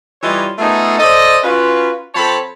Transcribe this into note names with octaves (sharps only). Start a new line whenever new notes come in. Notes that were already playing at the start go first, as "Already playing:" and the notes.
E3 G3 F4 A4 C#5 D#5
A3 B3 D#4 F4 G#4 A4
A4 C5 D5 D#5
C#4 F4 F#4 B4
F3 C4 A4 C#5 A5 B5